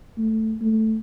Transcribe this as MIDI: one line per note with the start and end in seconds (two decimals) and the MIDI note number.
0.18 0.55 57
0.61 0.98 57